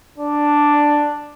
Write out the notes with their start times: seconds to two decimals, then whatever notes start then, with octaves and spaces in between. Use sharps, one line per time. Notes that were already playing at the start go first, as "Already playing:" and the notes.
0.18 D4